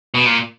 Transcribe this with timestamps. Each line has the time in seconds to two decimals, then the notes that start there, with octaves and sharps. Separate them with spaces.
0.14 B2
0.26 A#2